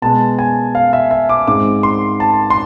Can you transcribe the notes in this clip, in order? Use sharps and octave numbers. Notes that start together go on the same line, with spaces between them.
B2 G#3 B3 A5
G#5
F5
E5
E5
D6
G#2 G#3 C4 D6
C6
A5
C6